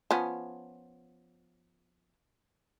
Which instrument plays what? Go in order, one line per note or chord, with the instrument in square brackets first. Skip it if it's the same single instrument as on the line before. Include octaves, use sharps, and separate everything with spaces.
[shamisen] F3 B3 C#4